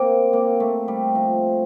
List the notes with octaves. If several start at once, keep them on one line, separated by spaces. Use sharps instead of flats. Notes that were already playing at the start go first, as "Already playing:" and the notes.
Already playing: A#3 C4
A#3
A3
G3
F3